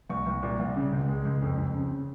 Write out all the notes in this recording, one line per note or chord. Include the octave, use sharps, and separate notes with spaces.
C2 C#6
C2
A#2
C2
C#3
C#2
G#3
C#2
F2
F2
C#3
C#3